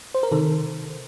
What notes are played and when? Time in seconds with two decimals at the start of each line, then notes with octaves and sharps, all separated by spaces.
0.14 C5
0.23 A#4
0.31 C3 D#3 A4